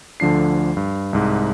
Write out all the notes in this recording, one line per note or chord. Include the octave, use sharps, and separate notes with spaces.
D2 D3 F3 D4 C7
G2
C2 G#2